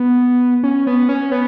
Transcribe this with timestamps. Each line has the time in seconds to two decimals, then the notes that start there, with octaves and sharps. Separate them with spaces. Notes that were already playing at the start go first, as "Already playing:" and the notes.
Already playing: B3
0.63 C#4
0.87 B3
1.09 C#4
1.32 B3